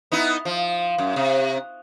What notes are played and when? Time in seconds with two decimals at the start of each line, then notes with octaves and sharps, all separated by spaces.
0.12 B3 D#4 E4
0.45 F3
0.98 F#2
1.16 C3